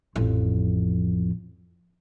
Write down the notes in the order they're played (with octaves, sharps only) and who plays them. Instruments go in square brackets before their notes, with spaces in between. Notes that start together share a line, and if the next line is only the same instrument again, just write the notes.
[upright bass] A1 F2